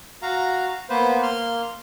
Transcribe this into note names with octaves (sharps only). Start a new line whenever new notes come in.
F#4 F5 A#5
A#3 B3 B4 C5
A#3 C6 F6